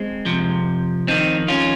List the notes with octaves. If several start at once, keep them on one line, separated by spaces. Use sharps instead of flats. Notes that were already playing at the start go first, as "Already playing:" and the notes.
Already playing: G#3 C4
F2 C3 F3
F2 D#3 C4 D#4
C#4 F4